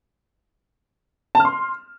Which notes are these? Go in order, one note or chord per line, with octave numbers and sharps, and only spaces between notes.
A5
F6
C6